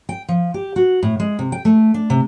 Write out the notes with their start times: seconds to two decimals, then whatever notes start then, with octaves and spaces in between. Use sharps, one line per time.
0.09 G5
0.29 F3
0.54 G4
0.76 F#4
1.03 A2
1.20 G#3
1.39 C3
1.52 G5
1.65 A3
1.94 D4
2.10 C3